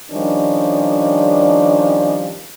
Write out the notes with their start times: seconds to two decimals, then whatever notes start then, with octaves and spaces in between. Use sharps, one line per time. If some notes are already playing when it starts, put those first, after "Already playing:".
0.12 D#3 F3 G3 C#4 D4